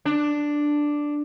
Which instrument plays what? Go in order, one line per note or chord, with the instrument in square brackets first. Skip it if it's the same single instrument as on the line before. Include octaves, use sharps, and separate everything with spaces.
[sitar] D4